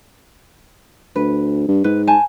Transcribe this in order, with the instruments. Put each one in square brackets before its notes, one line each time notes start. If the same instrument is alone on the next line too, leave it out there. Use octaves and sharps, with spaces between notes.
[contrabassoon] D2 [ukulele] B4
[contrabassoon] G2
[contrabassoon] G#2 [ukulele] B4
[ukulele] C5 G#5 A5